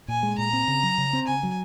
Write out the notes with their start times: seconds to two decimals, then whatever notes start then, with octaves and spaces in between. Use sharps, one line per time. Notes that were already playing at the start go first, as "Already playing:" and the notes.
0.08 A#2 G#5
0.23 G#3
0.38 A#2 A#5
0.53 C4
0.68 C#3
0.83 F#3
0.98 C#3
1.13 C4
1.27 C#3 G#5
1.43 F#3